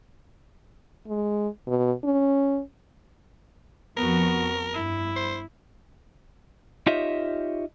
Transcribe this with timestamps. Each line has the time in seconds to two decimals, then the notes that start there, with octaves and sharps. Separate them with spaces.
1.08 G#3
1.67 B2
2.04 C#4
3.97 F2 F3 B3 F#4 A#4
4.74 G2 E4
5.16 C5
6.87 D#4 F4 G4 C#5 D#5 E5